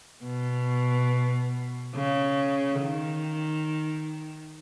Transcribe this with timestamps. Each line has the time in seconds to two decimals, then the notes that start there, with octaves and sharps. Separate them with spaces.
0.24 B2
1.95 C#3
2.80 D#3